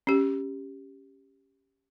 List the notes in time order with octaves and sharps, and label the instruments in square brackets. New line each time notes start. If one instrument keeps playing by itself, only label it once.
[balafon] C#4 G4